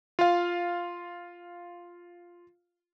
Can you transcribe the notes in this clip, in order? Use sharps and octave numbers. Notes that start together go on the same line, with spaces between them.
F4 F5